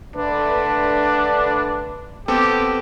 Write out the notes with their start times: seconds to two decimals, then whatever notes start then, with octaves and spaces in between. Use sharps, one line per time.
0.16 D3 A3 D4 B4
2.28 B3 C4 G4 A4